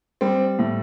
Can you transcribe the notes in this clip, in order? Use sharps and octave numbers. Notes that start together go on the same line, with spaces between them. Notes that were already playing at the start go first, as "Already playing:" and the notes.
G3 C4
A2